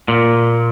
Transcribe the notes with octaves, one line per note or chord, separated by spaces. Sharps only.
A#2